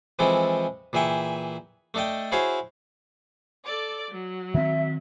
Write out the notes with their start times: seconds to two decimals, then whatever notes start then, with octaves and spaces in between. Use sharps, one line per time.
0.19 E3 F3 G#3 C4 E4 A4
0.93 A#2 E3 G#4 E5 G5 C#6
1.94 A3 D4 A4 D#5 G5
2.32 E4 F#4 G#4 C5 C#5 F5
3.64 A4 D5 D6
4.11 F#3
4.55 D#3 C4 E5